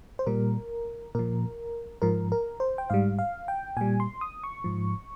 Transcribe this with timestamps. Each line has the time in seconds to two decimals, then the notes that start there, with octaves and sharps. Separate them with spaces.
0.19 C5
0.27 A#2 G3 A#4
1.15 A#2 F3 A#4
2.02 G#2 F3 A#4
2.32 A#4
2.60 C5
2.78 G5
2.90 G#2 G3 F5
3.19 F5
3.48 G5
3.77 A#2 G3 G#5
4.00 C6
4.21 D#6
4.44 C#6
4.64 G#2 F3